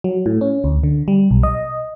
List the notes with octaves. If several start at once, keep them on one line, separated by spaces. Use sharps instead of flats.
F#3
A2
C#4
D2
D3
G3
B1
D#5